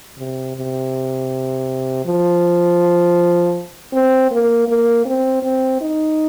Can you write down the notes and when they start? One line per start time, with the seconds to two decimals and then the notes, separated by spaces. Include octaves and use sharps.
0.19 C3
0.56 C3
2.06 F3
3.93 C4
4.32 A#3
4.68 A#3
5.06 C4
5.43 C4
5.82 D#4